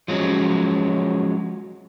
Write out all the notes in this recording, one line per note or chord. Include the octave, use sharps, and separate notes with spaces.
F3 F#3 G#3 C#4